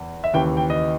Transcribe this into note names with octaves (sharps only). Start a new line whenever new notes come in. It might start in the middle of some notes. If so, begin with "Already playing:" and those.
Already playing: E2
E5
D#2 C#3 E3 G5
G5
D#5